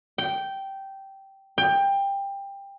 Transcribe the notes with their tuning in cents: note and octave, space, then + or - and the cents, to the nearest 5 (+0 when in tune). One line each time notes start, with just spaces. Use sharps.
G5 -10
G5 +20